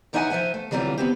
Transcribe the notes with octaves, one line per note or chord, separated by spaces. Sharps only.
F#2 E3 D#4 E5 F#5 G#5
F3 C5 E5 F#5 G#5
A3
D3 E3 F#3 G3 C4 F4
B3 C4 G4